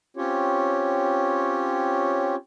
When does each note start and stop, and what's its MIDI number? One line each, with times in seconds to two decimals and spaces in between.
0.17 2.35 60
0.17 2.35 61
0.17 2.35 65
0.17 2.35 67
0.17 2.35 73